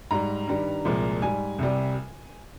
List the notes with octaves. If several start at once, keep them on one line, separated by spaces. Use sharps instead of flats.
G#2 G3 A#5
G2 D#3 G3
C2 A#2 F3 G#3
G#2 G3 G#5
C2 C3 G3